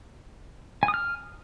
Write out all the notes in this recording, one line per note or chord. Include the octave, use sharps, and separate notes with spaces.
G#5
D#6
F6